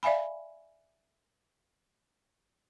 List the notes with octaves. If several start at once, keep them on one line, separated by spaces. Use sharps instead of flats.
D5 E5 F5 G#5 B5